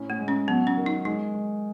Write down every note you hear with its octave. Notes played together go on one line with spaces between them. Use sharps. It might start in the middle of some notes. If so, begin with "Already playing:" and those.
Already playing: A2 C#4
A3
G#3
C#4
F#3 B3
C#4
D#3
D#4
G#3 D#4
G#3